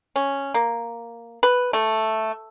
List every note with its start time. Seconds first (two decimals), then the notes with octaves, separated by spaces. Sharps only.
0.16 C#4
0.54 A#3
1.43 B4
1.73 A3